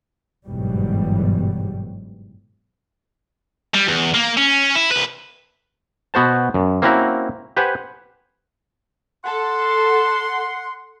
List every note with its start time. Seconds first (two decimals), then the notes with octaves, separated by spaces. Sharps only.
0.46 G1 E2 G#2 B2 F#3 G3
3.74 G3
3.88 E2
4.14 A#3
4.37 C#4
4.75 E4
4.92 C2 B4
6.14 B2 B3 F#4 C5 A5
6.54 F#2
6.82 A#3 C4 C#4 E4 F#4 A#4
7.57 G4 B4 C5 F#5 G#5
9.25 A4 F#5 C6